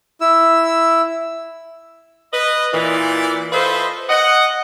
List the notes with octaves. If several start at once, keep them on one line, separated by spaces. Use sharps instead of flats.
E4 E6
B4 D#5
A#2 E3 D5
F4 A4 B4 C5 D#5 E5
D#5 F#5